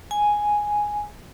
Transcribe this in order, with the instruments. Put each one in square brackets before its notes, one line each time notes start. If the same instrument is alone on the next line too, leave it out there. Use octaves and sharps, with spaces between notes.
[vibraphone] G#5